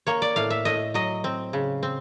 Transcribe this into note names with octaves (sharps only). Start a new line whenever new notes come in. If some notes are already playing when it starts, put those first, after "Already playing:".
A#3 C#5
D5
A2 F5
E5
A2 D#5
F#3 D#5
C4
C#3
C4